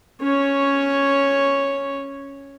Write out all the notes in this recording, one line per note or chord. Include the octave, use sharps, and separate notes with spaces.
C#4 C#5